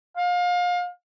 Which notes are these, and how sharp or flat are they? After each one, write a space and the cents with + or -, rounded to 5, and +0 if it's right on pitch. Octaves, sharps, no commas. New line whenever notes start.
F5 +30